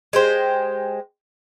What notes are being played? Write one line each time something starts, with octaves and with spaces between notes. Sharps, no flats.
G#3 G4 C5